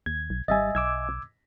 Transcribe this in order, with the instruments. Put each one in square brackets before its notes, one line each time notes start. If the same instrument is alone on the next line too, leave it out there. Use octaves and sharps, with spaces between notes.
[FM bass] D#2 [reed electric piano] G#6
[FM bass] B1
[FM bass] G#1 [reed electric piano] G3 A6 [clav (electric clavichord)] D#5 E5 G#5
[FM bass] B1 [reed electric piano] D6 E6 G#6